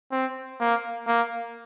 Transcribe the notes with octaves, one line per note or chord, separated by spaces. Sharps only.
C4
A#3
A#3